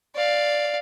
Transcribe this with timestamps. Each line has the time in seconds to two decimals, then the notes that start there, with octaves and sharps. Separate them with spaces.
0.15 D5 F5